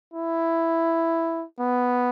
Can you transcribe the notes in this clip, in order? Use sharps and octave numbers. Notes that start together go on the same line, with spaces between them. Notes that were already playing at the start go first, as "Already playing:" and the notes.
E4
B3